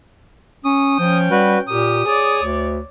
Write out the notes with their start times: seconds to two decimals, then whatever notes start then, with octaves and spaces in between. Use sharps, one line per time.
0.65 C#4 D#6
1.00 F3 C#4 G5
1.31 G3 F#4 B4
1.67 A#2 G4 A#4 D#6
2.05 G#4 C#5 D5
2.43 D2